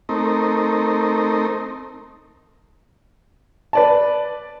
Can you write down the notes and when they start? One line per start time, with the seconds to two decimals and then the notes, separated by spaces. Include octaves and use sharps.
0.09 A3 C4 D#4 A#4
3.73 B4 D5 A5